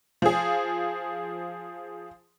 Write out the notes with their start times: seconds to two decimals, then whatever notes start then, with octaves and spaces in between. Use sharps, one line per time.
0.22 F3 G#4